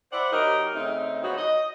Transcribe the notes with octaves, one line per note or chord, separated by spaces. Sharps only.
E4 C5 D5 E5 F#5
F#3 D#4 G4 A#4
C#3 A3 C4 D#4
F3 F#3 B3 D#4 F#4
D#5